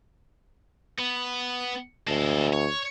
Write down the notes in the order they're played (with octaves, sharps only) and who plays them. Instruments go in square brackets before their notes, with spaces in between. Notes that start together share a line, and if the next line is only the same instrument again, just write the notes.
[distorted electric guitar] B3
[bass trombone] D2 [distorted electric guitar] G#3 A4
[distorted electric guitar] C#5